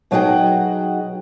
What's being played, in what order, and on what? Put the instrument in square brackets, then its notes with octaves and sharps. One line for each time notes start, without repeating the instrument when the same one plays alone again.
[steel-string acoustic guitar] B2 F#3 D#4 F#4 G#4 G5